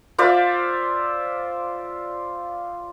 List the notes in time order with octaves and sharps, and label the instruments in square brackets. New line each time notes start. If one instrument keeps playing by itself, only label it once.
[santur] F4 C5 D5 E5